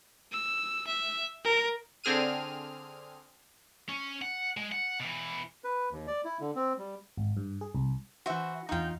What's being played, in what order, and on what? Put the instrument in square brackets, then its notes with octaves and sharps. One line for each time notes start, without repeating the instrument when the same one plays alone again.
[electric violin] E6
E5
A#4
[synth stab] D3 C4 G#4 F6 D#7
[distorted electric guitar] C#4
F#5
G#3
F#5
B2 E3
[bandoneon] B4
D#2
D5
E4
D3
C4
G3
[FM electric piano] G#1
G2
G#4
C2
[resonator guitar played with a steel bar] E3 F#4 [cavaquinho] C5 E5
[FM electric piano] E2 A#5 [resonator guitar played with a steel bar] D#4 F4 [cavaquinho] F#4 G5